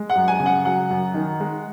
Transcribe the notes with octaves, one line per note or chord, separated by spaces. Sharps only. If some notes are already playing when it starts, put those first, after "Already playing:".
Already playing: G#3
F#5
F#2
G#5
C#3
F#5
F#3 F#5
F#2
D#3
G#3